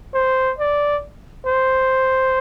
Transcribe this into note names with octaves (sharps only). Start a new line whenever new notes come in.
C5
D5
C5